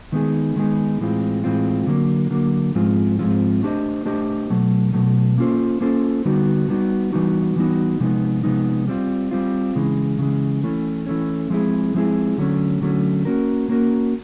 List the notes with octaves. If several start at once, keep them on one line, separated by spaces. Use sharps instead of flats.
D#3 G#3 B3 D#4 G#4
D#3 G#3 B3 D#4 G#4
A2 E3 G#3 C4 F4
A2 E3 G#3 C4 F4
D3 F#3 A#3
D3 F#3 A#3
G#2 F3 G#3 C4 F4
G#2 F3 G#3 C4 F4
A3 D4 G4 C5 D#5
A3 D4 G4 C5 D#5
B2 F#3 A3
B2 F#3 A3
A#3 C#4 F4 A4 C5
A#3 C#4 F4 A4 C5
D3 G3 B3 D#4 F#4
D3 G3 B3 D#4 F#4
E3 G3 B3 D#4 F#4
E3 G3 B3 D#4 F#4
C3 F3 G#3 B3 D#4
C3 F3 G#3 B3 D#4
G3 C4 F4
G3 C4 F4
C#3 E3 G#3
C#3 E3 G#3
E3 A3 C#4
E3 A3 C#4
F3 G#3 C4 E4 G#4
F3 G#3 C4 E4 G#4
D3 F#3 A3 C#4
D3 F#3 A3 C#4
A#3 C#4 F#4 A#4
A#3 C#4 F#4 A#4